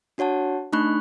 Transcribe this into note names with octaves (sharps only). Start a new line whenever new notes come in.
D4 F#4 C#5 F#5 A5
A3 D4 D#4 B5 C#6 F#6